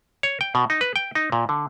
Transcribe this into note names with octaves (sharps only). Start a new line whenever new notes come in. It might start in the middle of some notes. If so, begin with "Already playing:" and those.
C#5
G5
B2
D#4
B4
G5
D#4
A#2
D3